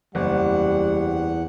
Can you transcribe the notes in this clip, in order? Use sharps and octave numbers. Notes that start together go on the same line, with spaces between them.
F#1 E2 G3 F#5